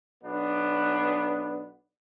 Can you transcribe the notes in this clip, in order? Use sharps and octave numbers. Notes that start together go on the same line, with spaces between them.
B1 B3 D4